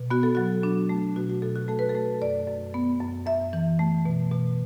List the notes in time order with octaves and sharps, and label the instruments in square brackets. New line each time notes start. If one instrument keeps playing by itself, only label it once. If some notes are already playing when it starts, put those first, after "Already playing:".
Already playing: [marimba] B2
B3 F#4
A4
F#3 F#4
D4
A3
B2 F#4
F#4
B2 A4
F#4
A3 A4
B4
A4
A3
F#2 D5
F#2
B3
F#2
F#2 E5
E3
A3
B2
B2